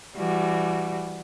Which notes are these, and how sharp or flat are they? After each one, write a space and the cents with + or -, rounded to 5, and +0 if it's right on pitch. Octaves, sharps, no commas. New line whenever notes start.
E3 +30 G3 +15 F#4 +0